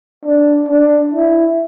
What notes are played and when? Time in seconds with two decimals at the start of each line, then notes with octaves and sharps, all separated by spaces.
0.25 D4
0.69 D4
1.14 E4